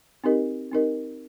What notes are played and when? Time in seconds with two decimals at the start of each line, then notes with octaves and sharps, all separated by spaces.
0.24 C4 D#4 G4 A#4 D#5
0.72 C4 D#4 G4 A#4 D#5